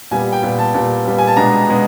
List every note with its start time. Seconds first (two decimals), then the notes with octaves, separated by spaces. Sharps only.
0.11 A#2 G3 B3 G#5
0.32 G5
0.43 A#2 G3 B3
0.59 A5
0.74 A#2 G3 B3 A5
1.05 A#2 G3 B3
1.18 G#5
1.27 A5
1.37 B2 G#3 B3 D4 A#5
1.68 B2 G#3 B3